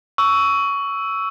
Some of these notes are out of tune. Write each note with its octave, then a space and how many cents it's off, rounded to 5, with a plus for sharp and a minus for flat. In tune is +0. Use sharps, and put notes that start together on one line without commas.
C#6 +15 E6 +0